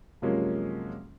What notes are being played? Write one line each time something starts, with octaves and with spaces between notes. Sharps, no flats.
F#2 C3 F3 G#3 A#3 C#4